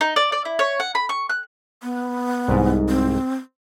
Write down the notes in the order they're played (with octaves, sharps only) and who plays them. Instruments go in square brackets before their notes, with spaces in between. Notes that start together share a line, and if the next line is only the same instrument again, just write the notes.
[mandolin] D#4
D5
D5
E4
C#5
F#5
B5
C#6
F#6
[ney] B3
[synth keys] C2 G#2
[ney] C4